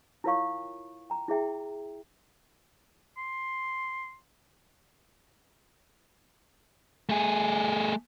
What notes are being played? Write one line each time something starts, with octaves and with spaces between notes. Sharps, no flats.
E4 F4 A#4 C#5 F5 C#6
G5 A#5
E4 G#4 E5 G5
C6
A3 G#4